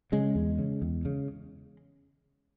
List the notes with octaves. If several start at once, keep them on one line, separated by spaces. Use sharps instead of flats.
C#3 G#3
E2
C#3
E2
C#3